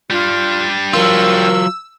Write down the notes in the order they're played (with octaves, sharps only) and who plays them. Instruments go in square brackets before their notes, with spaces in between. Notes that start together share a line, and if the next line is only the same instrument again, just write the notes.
[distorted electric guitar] G3 D4 [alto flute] F4
[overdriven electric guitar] F#3 F4 [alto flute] A#4 [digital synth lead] E6